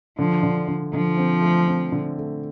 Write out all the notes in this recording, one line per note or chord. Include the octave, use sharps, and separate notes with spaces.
D3 F3
D3
D3
D3 F3
C4
A3
C4
D3
A3